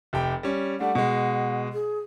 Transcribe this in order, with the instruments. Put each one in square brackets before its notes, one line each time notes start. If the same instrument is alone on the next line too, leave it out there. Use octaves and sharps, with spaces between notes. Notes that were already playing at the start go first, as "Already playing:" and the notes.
[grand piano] F1 G4 G5
G3 C#4
[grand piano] G3 A3 D4 [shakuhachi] F#5
[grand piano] B2 G#3
[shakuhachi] G#4